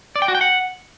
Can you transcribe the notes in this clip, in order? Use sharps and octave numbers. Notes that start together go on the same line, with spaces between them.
D5
G5
F#4
G5
F#5